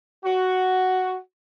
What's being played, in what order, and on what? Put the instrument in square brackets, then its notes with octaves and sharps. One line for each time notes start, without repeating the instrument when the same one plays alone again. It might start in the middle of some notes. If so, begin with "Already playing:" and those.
[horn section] F#4